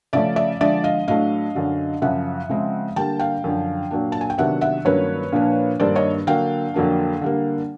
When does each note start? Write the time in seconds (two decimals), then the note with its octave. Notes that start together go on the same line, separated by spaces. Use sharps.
0.13 C#3 F3 A3 C#4 D5 E5
0.36 D5 E5
0.61 D3 F3 G#3 D5 E5
0.84 D#5 F5
1.08 A2 F#3 A3 D4 D#5 F5
1.55 F#2 D3 F#3
2.02 F#2 C#3 F3 E5 F#5
2.49 C#3 F3 G#3 C4
2.96 D3 G3 A#3 G5 A5
3.20 F5 G5
3.44 F#2 D3 F3
3.91 A#2 F#3 A#3 D4
4.12 A5
4.21 G#5
4.30 G5
4.38 C3 D#3 F#3 B3 D4 E5 F#5
4.61 E5 F#5
4.85 G2 D#3 F#3 A#3 C#4 B4 C#5
5.32 A#2 F3 A#3 D4
5.80 G2 D#3 G3 A#3 D4 C5 D5
5.95 C#5 D#5
6.27 D3 F#3 A#3 D4 F5 G5
6.74 F2 D3 F#3 A#3 D4
7.21 D3 G3 A#3